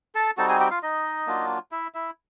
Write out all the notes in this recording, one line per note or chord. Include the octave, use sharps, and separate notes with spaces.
A4 A5
G3 C4 D#4 F#4 A4 A5
G#4 G#5
G4 G5
F4 F5
D#4 D#5
F#3 A#3 D4 F4
E4 E5
E4 E5